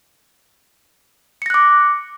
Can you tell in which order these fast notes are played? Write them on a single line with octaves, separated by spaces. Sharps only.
C#7 A#6 F#6 D6